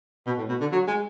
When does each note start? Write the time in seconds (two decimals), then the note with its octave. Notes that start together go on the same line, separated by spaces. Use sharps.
0.26 B2
0.38 A2
0.49 B2
0.60 D3
0.72 F#3
0.87 G#3